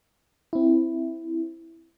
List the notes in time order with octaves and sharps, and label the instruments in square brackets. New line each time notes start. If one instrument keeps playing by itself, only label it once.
[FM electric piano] C4 E4